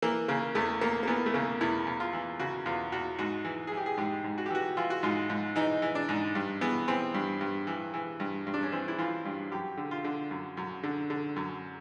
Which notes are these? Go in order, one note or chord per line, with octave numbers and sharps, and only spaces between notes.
E3 A#3
C#3 A#3
E2 A3
E2 A#3
A#3
E3 B3
A3
C#3 A#3
E2 E4
E2
F4
E3
C#3 F#4
E2 F4
E2 F#4
G#2 F#4
E3
G#4
E3
G4
G#4
G#2 G4
G#2
F#4
G4
E3 F#4
E3 F4
F#4
G#2 F4
G#2
E3 D#4
E3
D4
G#2
G2
E3 B3
E3 C4
G2
G2
E3
E3
G2
G2
D4
C#4
E3 C4
E4
E3 F4
G2
F#2 G4
D3
F4
D3
F#2
F#2
D3
D3
F#2